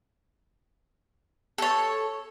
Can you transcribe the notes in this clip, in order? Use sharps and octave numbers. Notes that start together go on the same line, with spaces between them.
A4 C#5